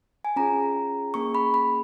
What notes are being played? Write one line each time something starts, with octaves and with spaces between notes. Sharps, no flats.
G#5
C#4 F4 G#4 A#5
A#3 C#4 G#4 C#6
B5
B5